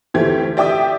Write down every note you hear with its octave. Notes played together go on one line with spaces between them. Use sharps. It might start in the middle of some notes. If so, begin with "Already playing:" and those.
D2 E3 A3 C4 G4 G#6
G4 D5 E5 G5 D6 D#6